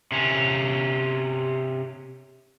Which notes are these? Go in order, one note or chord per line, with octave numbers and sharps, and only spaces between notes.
C3 C#4